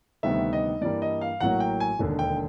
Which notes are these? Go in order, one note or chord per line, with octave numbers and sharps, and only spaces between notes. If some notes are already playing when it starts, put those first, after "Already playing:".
D2 C3 D#3 G3 B3 E5
D#5
G2 E3 G3 A#3 D5
D#5
F5
A1 A2 F#3 A#3 F#5
G5
G#5
E1 D#2 D3
G5